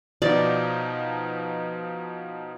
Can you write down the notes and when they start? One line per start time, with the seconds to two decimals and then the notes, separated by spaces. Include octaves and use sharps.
0.22 B2 F3 D#4 D5